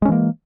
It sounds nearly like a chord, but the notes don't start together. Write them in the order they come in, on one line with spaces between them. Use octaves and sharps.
G#3 C#4 E3 A#3